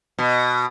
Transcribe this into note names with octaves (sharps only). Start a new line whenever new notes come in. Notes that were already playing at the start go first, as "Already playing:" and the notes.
B2